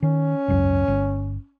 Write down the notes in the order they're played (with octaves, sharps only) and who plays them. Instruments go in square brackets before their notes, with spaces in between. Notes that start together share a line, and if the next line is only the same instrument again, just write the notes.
[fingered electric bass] D#3 [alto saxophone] C#4
[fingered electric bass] G#1 C#2 F#2
G1